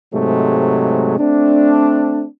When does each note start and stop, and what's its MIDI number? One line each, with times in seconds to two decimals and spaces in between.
0.14 1.17 44
0.14 1.17 48
0.14 1.17 54
0.14 1.17 56
0.14 1.17 57
1.18 2.25 57
1.18 2.25 60
1.18 2.25 62